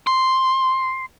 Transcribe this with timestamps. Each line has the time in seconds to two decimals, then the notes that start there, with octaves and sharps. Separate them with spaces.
0.07 C6